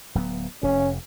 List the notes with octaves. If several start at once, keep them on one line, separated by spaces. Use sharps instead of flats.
D1 F#3 B3
F1 C3 C#4